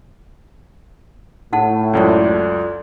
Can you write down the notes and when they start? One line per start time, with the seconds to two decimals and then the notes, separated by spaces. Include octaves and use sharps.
1.53 A2 D#4 F#5 A5
1.93 C#2 F#2 F4 A4 D5